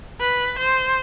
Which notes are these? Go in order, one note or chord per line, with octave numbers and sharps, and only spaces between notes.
B4
C5